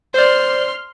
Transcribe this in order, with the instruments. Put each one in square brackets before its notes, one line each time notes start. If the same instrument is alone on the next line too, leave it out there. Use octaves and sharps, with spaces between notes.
[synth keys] C5 D5 [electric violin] C6 F6